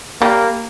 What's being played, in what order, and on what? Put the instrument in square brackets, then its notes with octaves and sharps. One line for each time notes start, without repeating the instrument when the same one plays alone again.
[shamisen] G3 [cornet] A#3